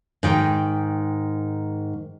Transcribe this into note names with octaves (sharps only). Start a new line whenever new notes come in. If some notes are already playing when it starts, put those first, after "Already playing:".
G#2 D#3 G5